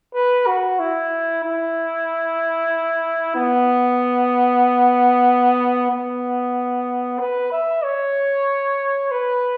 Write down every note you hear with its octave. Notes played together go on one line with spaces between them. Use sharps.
B4
F#4
E4
E4
B3
B3
B4
E5
C#5
B4